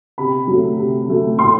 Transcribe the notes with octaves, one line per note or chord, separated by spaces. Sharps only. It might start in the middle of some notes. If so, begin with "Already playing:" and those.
C3 B5
F#3 A3
C3
F#3 A3
A2 C6